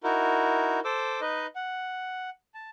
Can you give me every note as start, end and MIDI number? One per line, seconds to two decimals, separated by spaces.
0.04 0.80 63
0.04 0.80 64
0.04 0.80 66
0.04 0.80 70
0.85 1.20 69
0.85 1.20 72
0.85 1.20 86
0.85 1.20 88
1.21 1.47 63
1.21 1.47 71
1.21 1.47 75
1.56 2.30 78
2.54 2.70 81